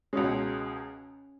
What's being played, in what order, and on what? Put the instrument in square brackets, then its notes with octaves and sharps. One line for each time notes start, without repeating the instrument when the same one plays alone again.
[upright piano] C#2 B2 G#3 [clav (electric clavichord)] C#4